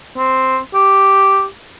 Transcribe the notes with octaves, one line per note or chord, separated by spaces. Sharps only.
C4
G4